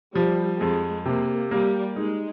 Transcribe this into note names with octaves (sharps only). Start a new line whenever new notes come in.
F3 G3
F2 G#3
C3 A#3
G3 A#3
G#3 D#4